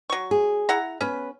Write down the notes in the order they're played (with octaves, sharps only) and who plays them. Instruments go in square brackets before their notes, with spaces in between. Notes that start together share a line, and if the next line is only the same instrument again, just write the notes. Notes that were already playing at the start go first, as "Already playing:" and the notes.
[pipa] F#3 C#6
[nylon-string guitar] G#4
[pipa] E4 F#5 A#5
[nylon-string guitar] B3 B4 [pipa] C#4